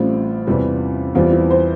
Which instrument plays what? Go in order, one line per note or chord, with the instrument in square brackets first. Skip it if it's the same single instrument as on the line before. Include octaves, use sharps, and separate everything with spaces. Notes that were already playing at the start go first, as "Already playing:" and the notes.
Already playing: [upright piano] A1 A2 G3 C4 F4
E2 C3 E3 G3
E2 E3 G3 C4 F4
E4
C5